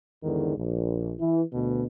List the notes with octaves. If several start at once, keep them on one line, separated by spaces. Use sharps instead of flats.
E2 G#2 D3 D#3
A#1
E3
D2 B2